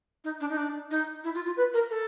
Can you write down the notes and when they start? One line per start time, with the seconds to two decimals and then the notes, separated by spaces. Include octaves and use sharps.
0.24 D#4
0.40 D4
0.50 D#4
0.57 D4
0.91 D#4
1.24 E4
1.35 F4
1.46 F4
1.57 B4
1.74 A#4
1.90 A4